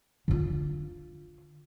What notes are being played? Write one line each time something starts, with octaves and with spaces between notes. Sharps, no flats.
D3 F4